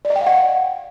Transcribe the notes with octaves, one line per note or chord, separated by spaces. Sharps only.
D5
D#5
G5
F5
F#5